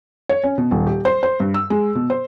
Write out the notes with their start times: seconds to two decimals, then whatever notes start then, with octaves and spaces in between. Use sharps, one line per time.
0.29 C#5
0.44 C#4
0.58 B2
0.71 D#1
0.87 G4
1.05 C5
1.23 C5
1.40 G2
1.54 E6
1.70 G#3
1.95 B2
2.10 C5